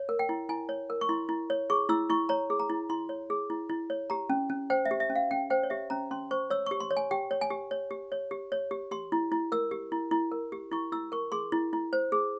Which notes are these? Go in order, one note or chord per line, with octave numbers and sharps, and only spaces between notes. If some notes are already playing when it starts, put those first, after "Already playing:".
Already playing: C#5
A#4
G5
E4
E4 G#5
C#5
A#4
C#6
E4 C6
E4
C#5
G#4 C#6
E4 E6
E4 C#6
C#5 A#5
G#4
A#5
E4
E4 C6
C#5
G#4
E4
E4
C#5
G4 A#5
C#4
C#4
C5 G5
E5
G4
E5
C#4
F5
C#4 G5
C5 G5
C#5
G4 E5
C#4 A#5
C#4 C6
C5 C#6
C#5 E6
G4 C#6
C6
C#5
G#5
G4 G5
C#5
G#5
G4
C#5
G4
C#5
G4
C#5
G4
G4 C6
E4
E4
A#4 E6
G4
E4
E4
A#4
G4
E4 C#6
E4 E6
A#4 C#6
G#4 C6
E4
E4
C5
G#4